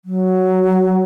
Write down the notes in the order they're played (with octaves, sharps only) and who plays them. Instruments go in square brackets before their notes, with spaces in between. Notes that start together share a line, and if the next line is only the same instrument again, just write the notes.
[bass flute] F#3